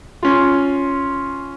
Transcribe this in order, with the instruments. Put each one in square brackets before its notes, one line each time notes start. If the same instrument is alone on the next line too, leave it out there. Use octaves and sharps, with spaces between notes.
[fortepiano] C#4 F4